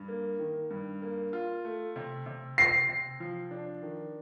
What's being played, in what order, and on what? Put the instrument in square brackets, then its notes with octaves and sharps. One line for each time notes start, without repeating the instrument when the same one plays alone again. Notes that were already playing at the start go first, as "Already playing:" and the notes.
Already playing: [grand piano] G2
A#3
D#3
G2
A#3
F4
A3
C3
C3
[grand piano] C3 [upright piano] C7
[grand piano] C3
F3
D4
D#3